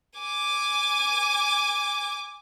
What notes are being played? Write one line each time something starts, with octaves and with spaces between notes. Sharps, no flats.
G#5 D6